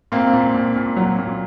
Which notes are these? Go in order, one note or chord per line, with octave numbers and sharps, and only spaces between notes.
A#2 A#3 C4
A#2
A#2
A#2
F#3
A#2